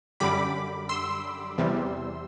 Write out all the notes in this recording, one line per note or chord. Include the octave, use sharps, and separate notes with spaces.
F#2 D3 G3 B5 D6
C6 E6
E2 C3 G3